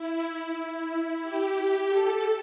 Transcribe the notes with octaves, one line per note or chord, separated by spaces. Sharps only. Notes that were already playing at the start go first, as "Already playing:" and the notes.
Already playing: E4
G4
A4